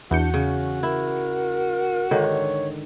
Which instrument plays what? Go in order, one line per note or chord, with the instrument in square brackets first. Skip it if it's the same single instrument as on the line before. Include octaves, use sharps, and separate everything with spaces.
[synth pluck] E2 G6 C#7 [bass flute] D4 [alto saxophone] F#4
[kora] C#3 [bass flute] C#4
[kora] E4 [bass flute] A#4
[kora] G#2 D3 D#3 [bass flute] C#5